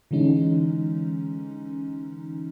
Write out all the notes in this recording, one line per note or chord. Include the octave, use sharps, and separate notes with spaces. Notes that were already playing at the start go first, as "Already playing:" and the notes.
D3 E3 G#3 C#4 D#4